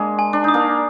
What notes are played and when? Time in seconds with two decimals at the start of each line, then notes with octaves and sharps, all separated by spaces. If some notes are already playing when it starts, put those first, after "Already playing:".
Already playing: G#3 A#3 D4
0.19 G#5
0.33 D4
0.44 D#4 D#6
0.54 A#3 D4